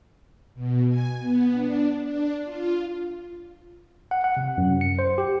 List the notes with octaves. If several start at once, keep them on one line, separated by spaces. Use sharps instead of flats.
B2
G#5
B3
D4
D4
F4
F#5
F#5
C3
F#2
C#7
C5
G4